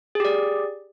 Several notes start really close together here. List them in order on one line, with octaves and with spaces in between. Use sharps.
G#4 G4 D5